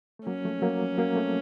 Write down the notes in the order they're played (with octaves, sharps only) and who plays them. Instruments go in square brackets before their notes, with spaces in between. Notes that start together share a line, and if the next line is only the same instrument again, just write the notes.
[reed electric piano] A3
[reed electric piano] F#3 A#3 [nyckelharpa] C#4
[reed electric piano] F3 A3
F#3 A#3
F#3 A#3
A3 C4